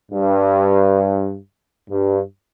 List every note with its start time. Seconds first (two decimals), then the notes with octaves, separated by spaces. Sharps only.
0.12 G2
1.90 G2